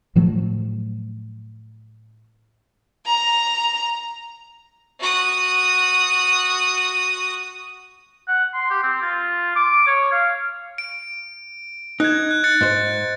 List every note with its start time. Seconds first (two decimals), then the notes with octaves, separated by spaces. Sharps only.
0.15 A2 F3 F#3 A3
3.06 A#5
5.00 F#4 D#6
8.28 F#5
8.54 C6
8.70 G4
8.83 C4
9.02 F4
9.56 D6
9.87 C#5
10.12 F5
10.78 D7
12.00 D#4 F#6 G#6
12.31 F#6
12.44 F#6 A6 C#7
12.61 G#2 C5